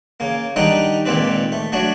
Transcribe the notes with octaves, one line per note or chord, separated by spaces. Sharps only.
C#3 A#3
D#3 G3 D4 D#4 F#5 G5
C#2 A#2 D#3 C4 B4 D5
A3
F#3 A3 D4 F#4